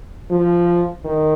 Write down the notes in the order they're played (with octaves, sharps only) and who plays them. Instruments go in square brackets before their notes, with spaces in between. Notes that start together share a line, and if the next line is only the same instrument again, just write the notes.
[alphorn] F3
D#3